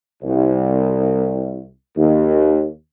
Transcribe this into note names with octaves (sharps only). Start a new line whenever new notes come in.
C2
D#2